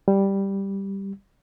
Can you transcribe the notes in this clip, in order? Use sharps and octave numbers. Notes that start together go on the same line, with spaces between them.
G3